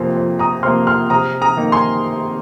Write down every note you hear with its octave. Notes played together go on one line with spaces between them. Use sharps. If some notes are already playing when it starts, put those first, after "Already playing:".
Already playing: F2 C3 F3 A#3 G#5 C6
F2
A#5 D#6
C3 F3 A#3 C6 F6
C6 F6
C3 A#5 D#6
A#5 D#6
D#3 A#3 D#4
G#5 C6